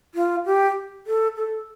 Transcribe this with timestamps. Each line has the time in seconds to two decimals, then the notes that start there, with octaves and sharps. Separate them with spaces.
0.15 F4
0.46 G4
1.07 A4
1.37 A4